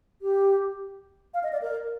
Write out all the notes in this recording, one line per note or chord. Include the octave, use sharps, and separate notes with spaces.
G4
F5
D#5
D5
A#4